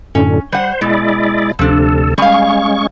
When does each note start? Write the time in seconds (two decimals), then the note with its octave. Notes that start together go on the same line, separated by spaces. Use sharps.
0.15 F#2 A2 D3 C#4
0.52 G3 C5 F#5
0.81 B2 G#3 E4 D5
1.59 D2 C3 F3 D4 A4
2.18 G3 G#3 C#4 F5 C#6